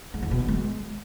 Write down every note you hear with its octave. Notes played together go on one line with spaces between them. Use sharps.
G#2
E2
B2
D#3
G#3